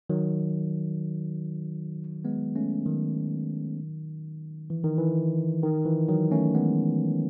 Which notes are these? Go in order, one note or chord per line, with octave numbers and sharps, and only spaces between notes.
D#3 F#3
G#3 B3
A3 C#4
D#3 F#3
E3
D#3
E3
D#3
E3
D#3 F#3
A3 C#4
G#3 B3